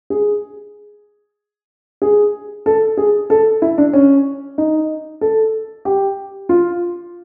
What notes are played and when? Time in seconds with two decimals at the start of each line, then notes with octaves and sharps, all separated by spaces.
0.10 G#4
2.02 G#4
2.66 A4
2.97 G#4
3.30 A4
3.62 E4
3.78 D4
3.93 C#4
4.58 D#4
5.21 A4
5.85 G4
6.49 F4